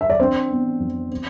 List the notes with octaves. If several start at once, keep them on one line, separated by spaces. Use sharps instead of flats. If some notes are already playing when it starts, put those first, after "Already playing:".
E5
D5
C4 D4 C5
B3
F2
C4